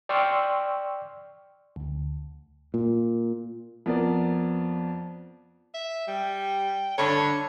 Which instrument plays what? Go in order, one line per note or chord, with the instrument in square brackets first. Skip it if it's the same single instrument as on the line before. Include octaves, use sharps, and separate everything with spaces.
[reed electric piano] D5 G5 C6 C#6 E6 F6
[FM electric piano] D2
[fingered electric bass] A#2
[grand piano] F2 B3 A#4 D5
[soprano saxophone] E5
[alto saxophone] G3 [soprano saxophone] G5
[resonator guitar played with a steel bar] G2 D3 D4 [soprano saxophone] A4 [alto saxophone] C#5